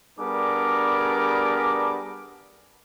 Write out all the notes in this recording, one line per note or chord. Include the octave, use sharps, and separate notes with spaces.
G3 B3 D4 G#4 A#4 D6